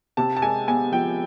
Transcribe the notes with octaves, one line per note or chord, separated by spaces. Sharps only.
C3 A5
A5
G#3 G#5
B3 G#5
F3 G5